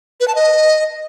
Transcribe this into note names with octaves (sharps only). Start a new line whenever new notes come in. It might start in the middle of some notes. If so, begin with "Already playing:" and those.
B4
A5
D#5